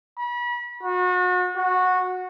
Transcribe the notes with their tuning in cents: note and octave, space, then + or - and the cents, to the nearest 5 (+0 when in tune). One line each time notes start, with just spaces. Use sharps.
B5 -35
F#4 -35
F#4 -15